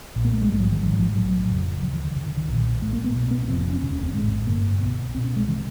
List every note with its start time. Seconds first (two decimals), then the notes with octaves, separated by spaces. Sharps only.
0.16 B1 A#2
0.25 A#3
0.33 A3
0.42 G#3
0.49 A#1 G#2 G3
0.60 F#3
0.71 D#3
0.82 G#1 G#2 E3
0.93 F#3
0.99 F3
1.15 B1 A2 F#3
1.49 F1 F2 C#3
1.82 D2 C#3 F3
1.93 E3
2.05 D#3
2.15 C#2 C3
2.26 D3
2.37 D#3
2.48 B1 A#2
2.82 A1 A2 A3
2.93 A#3
3.04 B3
3.15 C2 B2
3.31 B3
3.43 B3
3.48 F1 F2 C3 C4
3.70 C#4
3.81 E1 D2 C3 C#4
3.92 C#4
4.04 C4
4.14 A1 G#2 G#3
4.47 G1 G2 D3 A#3
4.81 C2 B2 B3
5.14 C2 C4
5.17 B2
5.24 C#4
5.36 G#3
5.48 C3 E3